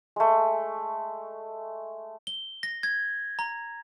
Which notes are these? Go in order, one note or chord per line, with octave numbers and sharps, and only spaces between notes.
G#3 A3
G7
A#6
G#6
A#5